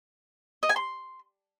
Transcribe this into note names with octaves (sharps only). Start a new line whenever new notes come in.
D#5
G#5
C6